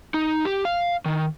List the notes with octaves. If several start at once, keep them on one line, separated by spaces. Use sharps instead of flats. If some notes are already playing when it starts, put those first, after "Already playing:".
D#4
G4
F5
D#3